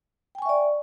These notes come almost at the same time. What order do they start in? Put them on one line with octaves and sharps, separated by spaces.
G5 G#5 C#6 E5 D5